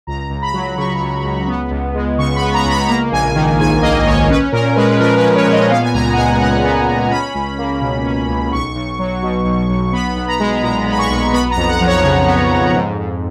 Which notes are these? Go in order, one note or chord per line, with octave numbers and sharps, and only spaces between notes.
C#2 A#5
C#2
B5
F#3
C#3 C#6
C#2
C#2
B3
C#2
G#3
C#3 C#6
B5
B3
A#5
C#2
B5
A#3 A#5
A#1 G#5
D#3
G#2 G#5
A#3 D#5
A#1 C#5
C#4 B4
A#2 A#4
G#3 B4
F3 A#4
B4
C#4
C#5
A#2
D#5
B3 F5
G#5
C#2 A#5
F#5
G#3 G#5
C#3 F#5
B3
C#2
C#4 B5
C#2
A#3
B2
C#4
C#2
B1 C#6
B1
F#3
B2
B1
B1
B3 B5
B1
A#5
G#3
A#2 A#5
B3
B5
C#6
B1
B3 B5
A#5
F2
F#5
F3
C#5
C#3
B3
F2
G#2
G#2